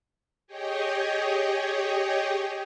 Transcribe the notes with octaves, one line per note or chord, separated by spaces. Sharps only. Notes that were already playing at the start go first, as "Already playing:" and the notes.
G4 G#4 C#5 D#5 G5